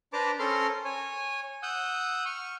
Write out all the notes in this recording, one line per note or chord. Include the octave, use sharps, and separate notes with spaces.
D4 B4 C5 A5 A#5 D6
C#4 A4 A#4 C5 C6 F6
C#5 G#5
F#5 D#6 E6 G6
C#6 F6